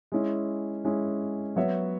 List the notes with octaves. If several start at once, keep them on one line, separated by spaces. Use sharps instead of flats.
G#3 C#4 E4
G#3 C#4 E4
F#3 B3 F#4 C#5 E5